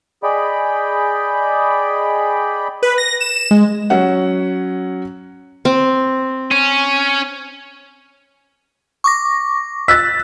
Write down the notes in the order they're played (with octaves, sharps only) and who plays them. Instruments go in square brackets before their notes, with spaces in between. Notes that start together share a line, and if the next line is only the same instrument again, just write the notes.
[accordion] G#4 D5 D#5 G5 B5
[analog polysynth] B4
A#6
E7
G#3
[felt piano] F#3 C#4 F#5
[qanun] C4
[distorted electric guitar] C#4
[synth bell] C#6 D6 A#6
[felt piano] E6 F#6 A6 [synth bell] B6